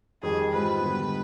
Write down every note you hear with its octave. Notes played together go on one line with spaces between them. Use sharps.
F2 D#3 G3 G#4
G#2 G3 C4 F4 B4
D3 G3 B3